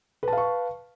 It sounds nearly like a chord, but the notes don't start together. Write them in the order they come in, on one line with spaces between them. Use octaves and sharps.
B4 A5 F5 C#6